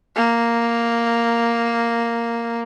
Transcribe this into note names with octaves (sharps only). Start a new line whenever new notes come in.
A#3